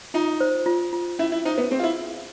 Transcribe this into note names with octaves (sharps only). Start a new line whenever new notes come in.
D#4 F4
C5
F4
F4
C#4 E4
E4
D#4 C5
B3
C4 G#4
F4
E4